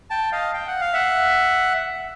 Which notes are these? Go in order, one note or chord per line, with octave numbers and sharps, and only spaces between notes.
G5 A5
D#5 F5
G5
F#5
F5
E5 F#5